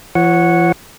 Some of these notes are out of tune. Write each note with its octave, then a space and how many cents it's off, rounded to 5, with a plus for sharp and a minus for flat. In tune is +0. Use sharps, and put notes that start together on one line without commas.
F3 -45 C#5 +0 F#5 -10